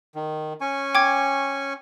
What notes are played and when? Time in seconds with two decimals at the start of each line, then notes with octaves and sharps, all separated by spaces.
0.15 D#3
0.61 C#4 G#5 C#6
0.95 G5 D6 G#6